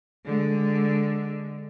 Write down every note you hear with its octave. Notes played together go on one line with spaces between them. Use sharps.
D3 G#3